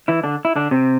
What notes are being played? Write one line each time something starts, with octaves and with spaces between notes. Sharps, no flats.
E3 E4
D3 D4
E4
D3 D4
C3 C4